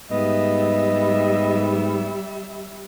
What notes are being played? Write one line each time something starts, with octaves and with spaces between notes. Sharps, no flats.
G#2 G3 B3 D#5 E5